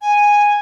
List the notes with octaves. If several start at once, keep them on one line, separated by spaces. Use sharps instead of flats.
G#5